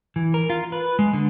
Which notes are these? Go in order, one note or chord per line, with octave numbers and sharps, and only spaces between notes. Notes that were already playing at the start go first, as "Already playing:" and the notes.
E3
A#4
F4
B4
G#3
D3